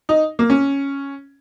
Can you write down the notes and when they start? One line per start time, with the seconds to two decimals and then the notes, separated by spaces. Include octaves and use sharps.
0.09 D#4
0.39 A#3
0.50 C#4